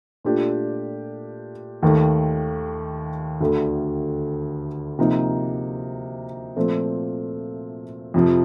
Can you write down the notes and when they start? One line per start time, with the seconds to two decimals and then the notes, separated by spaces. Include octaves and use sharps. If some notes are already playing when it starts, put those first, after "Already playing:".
0.24 A#2 A3 D4 G4
1.83 D#2 D#3 A3
3.41 D2 D3 A3
4.99 C3 F3 A#3 D#4
6.56 A#2 F3 A3 C4
8.14 F2 C3 F3